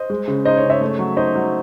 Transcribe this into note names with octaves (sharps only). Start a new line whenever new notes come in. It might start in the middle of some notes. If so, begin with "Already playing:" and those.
Already playing: C5 D#5
G#3
C#3
D#4 C5 D#5
C#5
C#3
C#5 E5
A3
F#3
D#4 C5 D#5
F#3